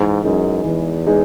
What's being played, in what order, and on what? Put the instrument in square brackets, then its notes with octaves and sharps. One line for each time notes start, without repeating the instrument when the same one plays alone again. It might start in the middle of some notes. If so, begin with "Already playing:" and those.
Already playing: [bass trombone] G#2 [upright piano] E3
[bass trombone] F#2 [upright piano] G#3 D#4 G#4
[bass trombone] E2 [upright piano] E3
[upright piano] G#3 D#4 G#4